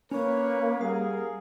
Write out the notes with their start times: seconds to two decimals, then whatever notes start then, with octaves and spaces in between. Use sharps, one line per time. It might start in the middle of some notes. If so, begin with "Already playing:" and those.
0.11 A#3 C#4 B4 C#5
0.81 G3 G#4 A#4 F5 F#5